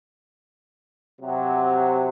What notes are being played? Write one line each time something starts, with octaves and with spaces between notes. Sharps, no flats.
C3 F#3